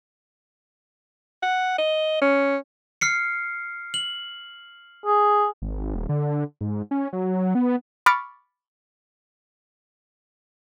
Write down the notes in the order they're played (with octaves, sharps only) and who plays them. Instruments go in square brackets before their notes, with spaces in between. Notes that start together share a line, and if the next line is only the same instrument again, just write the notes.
[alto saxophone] F#5
D#5
C#4
[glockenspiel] F6 C7 C#7
F#7
[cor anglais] G#4
[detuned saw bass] G#1
D#1
D3
G#2
C#4
F#3
B3
[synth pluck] B5 C#6 D6 F6 A6